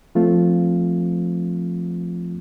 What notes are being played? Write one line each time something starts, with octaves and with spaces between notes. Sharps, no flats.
F3 A3 C4 F4